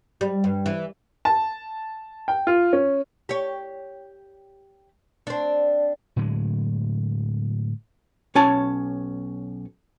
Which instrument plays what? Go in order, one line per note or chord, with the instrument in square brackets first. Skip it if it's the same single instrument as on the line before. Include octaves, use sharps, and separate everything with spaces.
[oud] G3
G2
E3
[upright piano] A5
G5
F4
C#4
[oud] G4 C#5
C4 D4
[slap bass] A2 D3 F#3 G#3
[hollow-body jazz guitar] B1 C#4 C#5 G#5 A5